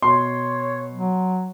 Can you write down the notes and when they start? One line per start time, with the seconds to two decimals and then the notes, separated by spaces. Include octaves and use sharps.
0.02 B2 C#5 C6
0.91 F#3